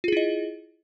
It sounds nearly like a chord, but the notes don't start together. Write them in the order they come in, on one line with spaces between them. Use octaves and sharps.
F4 G#4 E4 D#5